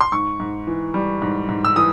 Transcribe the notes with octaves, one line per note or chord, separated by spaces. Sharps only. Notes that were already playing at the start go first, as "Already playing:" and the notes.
C6
G#2 C#6
G#2
E3
G3
G#2
G#2
E6
E3 D#6